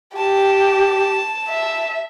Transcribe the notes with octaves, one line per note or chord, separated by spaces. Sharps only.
G4 A5
E5